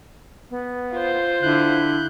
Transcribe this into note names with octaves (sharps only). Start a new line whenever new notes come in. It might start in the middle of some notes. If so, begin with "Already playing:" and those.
B3
F4 C5
D3 E4 F#6 G6